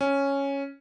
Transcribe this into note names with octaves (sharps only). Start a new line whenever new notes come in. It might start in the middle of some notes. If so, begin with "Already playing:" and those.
C#4